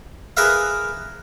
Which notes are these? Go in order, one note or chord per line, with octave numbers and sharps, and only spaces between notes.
G#4 A#4 B4 E5 F5